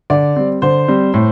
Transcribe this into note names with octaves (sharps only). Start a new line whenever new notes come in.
D3 D5
G3 C4
D3 C5
G3 C4
A2